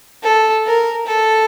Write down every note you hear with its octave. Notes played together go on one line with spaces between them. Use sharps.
A4
A#4
A4